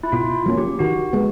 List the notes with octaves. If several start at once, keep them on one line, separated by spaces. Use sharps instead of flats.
E4
B2 F4
F#3 A#3 C#4
G4
D#3 F#4
G#3 B3